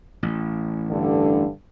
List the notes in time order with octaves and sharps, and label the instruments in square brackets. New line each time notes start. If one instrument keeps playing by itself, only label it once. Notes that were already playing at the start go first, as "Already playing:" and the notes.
[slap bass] A1
[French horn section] G2 D3